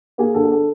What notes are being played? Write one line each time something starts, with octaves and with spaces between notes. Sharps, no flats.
A#3 G#4
D3 A4
G#4
A4